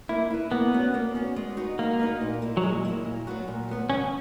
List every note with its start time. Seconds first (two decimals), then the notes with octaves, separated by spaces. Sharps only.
0.09 A#3 E4
0.30 E4 B4
0.51 A#3 B3
0.73 C#4 F#4
0.94 A#3
1.15 C#4 F#4
1.36 G#3
1.57 D#4 F#4 B4
1.79 G#3 A#3
1.99 D#4 F#4 B4
2.21 A#2
2.42 A#3 E4
2.57 F#3
2.63 A#2 G#3
2.85 A#3 E4
3.05 A#2
3.27 F#3 B3 F#4
3.48 A#2
3.69 F#3 B3 F#4
3.90 C#3 C#4